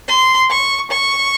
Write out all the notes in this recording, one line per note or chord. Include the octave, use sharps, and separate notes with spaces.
C6
C#6
C#6